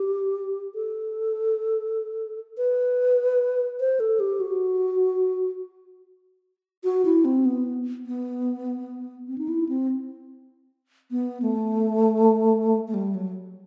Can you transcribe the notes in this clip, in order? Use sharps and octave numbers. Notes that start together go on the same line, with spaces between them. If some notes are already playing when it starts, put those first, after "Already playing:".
Already playing: G4
A4
B4
C5
A4
G4
F#4
F#4
E4
C4
B3
B3
C4
D#4
E4
C4
B3
A3
A3
G3
F#3